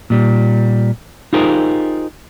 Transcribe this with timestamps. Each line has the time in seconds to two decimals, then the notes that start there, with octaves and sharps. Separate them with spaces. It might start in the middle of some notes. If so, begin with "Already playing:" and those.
0.10 A#2 G3
1.33 D#4 F4 G4 G#4 A#4 C5